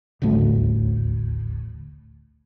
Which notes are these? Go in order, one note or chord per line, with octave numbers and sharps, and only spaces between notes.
D#1 A1 D2 A2